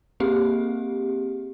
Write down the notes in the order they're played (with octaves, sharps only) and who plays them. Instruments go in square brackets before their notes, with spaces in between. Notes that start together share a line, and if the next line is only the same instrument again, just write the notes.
[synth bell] A#3 C4 G4 G#4